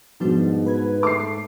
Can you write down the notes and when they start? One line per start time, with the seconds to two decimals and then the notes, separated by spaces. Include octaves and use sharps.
0.20 G#2 B2 F3 G3 D4
0.67 B4 B5 G#6
1.03 G#2 A3 G5 D6 C7